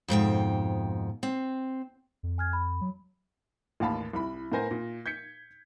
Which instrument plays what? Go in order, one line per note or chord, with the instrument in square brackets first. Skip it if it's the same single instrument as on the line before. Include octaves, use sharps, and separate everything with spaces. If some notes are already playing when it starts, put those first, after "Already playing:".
[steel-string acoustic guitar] F2 G#2 B2 G5
C4
[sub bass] F2
[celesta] G#5 F6 G#6
B5
[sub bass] F#3
[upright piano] A1 D#2 F5 A5 B5
C2 E4 B5
A2 B3 A#4 C5 G#5 A#6
A#2
G6 G#6 B6 C#7